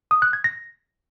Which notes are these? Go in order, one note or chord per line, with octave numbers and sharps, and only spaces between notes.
D#6
F#6
G#6
A#6